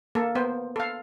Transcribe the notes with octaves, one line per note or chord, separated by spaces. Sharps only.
A#3 A4
B3 C5
A4 F5